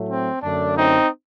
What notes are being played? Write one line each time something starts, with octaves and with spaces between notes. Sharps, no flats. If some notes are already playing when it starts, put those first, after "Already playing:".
Already playing: A2 F#3 A3
C4
F#2 D3 A3 D4
C4 D#4